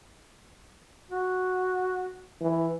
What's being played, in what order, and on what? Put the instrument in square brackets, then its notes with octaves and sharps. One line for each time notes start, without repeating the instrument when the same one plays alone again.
[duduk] F#4
[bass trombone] E3